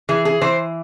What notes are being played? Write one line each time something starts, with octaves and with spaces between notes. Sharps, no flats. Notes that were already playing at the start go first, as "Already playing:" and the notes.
E3 G#4
G#4
E3 C5